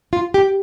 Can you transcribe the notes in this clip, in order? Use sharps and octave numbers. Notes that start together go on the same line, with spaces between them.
F4
G4